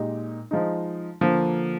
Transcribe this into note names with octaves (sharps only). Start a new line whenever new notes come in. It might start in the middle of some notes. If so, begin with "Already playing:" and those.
Already playing: A#2 G#3 D#4 G4
F3 G#3 D#4
D3 F3 A#3